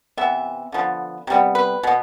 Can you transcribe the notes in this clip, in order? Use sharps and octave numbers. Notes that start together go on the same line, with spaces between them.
C3 E3 B3 E5
D3 F3 B3
C3 G3 B3
B4
B2 B3